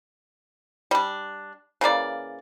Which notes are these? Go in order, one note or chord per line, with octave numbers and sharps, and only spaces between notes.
G3 D4
C#3 E3 A#3 D5